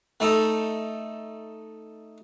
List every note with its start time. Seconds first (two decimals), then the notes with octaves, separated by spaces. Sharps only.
0.20 A3 D#4 A4